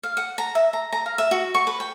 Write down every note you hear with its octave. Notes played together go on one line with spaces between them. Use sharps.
F5
F#5
A#5
E5
A#5
A#5
F5
E5
F#4
C#6
B4
G5